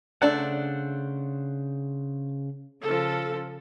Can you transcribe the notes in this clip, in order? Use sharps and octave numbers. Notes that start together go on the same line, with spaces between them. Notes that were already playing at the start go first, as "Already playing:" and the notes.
C#3 A3 D4 C5 F#5 A5
C#3 F3 A4